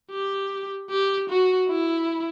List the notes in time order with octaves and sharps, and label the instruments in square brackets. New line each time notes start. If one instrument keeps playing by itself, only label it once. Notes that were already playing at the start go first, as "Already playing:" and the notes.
[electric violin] G4
G4
F#4
E4